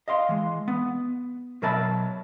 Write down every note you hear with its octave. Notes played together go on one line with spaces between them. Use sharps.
D#5 F5 C6
E3 G#3
B3
B2 F#3 A#4 E5 A5 B5